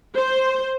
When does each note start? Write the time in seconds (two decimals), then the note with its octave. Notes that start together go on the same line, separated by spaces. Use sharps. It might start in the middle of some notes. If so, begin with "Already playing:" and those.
0.15 C5